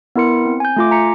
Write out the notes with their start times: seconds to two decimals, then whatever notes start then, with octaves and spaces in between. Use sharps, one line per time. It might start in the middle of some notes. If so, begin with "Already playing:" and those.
0.16 B3 E4 A#4 C6 C#7
0.46 C4
0.60 G#5 G6
0.76 A3 F4 D6
0.91 G#5 A#5 B6 C#7